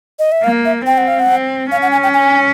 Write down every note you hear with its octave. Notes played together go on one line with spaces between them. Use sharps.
D#5
E5
A#3 F5
E5
C4 G5
F#5
F5
F#5
C4
C#4 F5
F#5
G#5
G5
G#5